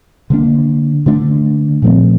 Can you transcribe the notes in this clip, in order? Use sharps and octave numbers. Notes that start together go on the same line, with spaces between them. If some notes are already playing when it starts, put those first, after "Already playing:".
D3 F3 A#3 D4
D3 A3 D4
A#2 F3 A3 C4